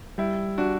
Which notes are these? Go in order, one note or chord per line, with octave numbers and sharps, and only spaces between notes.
G3 E4
D4 F#4